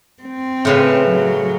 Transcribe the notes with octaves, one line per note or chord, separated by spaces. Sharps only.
C4
A2 C#3 B4
F#3